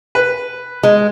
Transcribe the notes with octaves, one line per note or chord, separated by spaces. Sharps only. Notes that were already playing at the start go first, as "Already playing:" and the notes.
B4
G#3